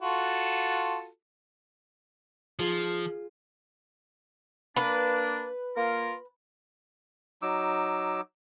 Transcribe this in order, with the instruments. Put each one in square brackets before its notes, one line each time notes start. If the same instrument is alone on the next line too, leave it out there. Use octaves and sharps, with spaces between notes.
[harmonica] F4 F#4 A4
[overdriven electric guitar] F3 [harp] F4 G#4
[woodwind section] A#3 D4 [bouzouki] B4
[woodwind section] A#3 F4 A#4
[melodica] F#3 D#4 D6 E6